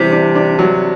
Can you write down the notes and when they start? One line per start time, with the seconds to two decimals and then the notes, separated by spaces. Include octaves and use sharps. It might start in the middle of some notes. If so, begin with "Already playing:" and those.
Already playing: C3 E3 G3 D4
0.12 D4
0.35 D4
0.59 F#3